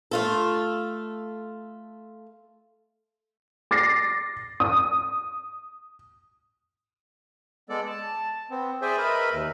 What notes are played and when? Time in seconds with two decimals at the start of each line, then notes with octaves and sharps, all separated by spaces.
0.11 A3 F4 A4
3.71 D6 A6 A#6 C7
4.60 D#6
7.69 G#3 B3 A4 D5
7.87 A5
8.51 B3 C4
8.82 G#4 C5 D5 E5 G5 G#5
8.98 A#4 B4 D#5 E5 B5
9.32 D#2